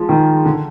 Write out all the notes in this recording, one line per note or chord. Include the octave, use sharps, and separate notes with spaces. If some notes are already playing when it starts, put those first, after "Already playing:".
Already playing: F3 G#3
D#3
D3